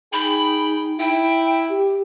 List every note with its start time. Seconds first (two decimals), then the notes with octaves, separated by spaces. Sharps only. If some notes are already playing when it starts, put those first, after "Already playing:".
0.13 D#4 G#4 G5 B5
0.99 E4 G5
1.70 G4